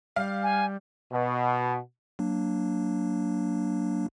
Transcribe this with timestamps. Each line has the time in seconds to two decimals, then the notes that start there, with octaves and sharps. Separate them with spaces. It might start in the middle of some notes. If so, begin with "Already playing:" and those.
0.16 G3 F5
0.43 G#5
1.12 B2
2.19 F#3 A#3 D4